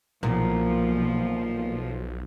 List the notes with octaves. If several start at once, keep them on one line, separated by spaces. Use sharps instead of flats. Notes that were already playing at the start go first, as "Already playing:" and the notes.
B1 E2 A#2 F3 A#3